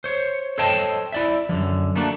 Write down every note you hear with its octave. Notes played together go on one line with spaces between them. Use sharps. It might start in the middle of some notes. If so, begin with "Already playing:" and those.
C5 C#5
A4 C5 C#5 D#5 G5 A5
E4 D5 E5
F#2 D3 F3
A3 A#3 D4 F#4